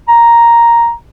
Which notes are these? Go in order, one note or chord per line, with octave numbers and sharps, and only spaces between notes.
A#5